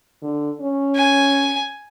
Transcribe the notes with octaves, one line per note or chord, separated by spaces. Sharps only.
D3
C#4
G#5